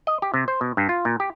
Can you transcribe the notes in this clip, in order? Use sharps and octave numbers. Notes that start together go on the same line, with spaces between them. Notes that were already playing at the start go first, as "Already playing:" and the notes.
D#5
G4
C3
C5
B2
G2
F4
A#2
G4